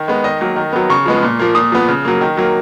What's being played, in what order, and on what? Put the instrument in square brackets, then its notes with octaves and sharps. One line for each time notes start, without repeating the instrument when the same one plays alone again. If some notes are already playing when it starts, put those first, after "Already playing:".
Already playing: [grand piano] D#3
G#3 B3
D#3 D#5
F#3 A#3
D#3
F#3 B3
C#3 C#6
F3 G#3 B3
A#2
F3 A#3
A#2 D#6
F3 B3
C#3
F#3 A#3
D#3
F#3 A#3